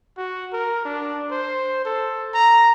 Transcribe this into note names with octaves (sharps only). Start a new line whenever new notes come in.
F#4
A#4
D4
C5
A4
A#5